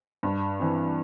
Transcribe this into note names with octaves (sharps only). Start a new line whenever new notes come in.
G2
E3 C4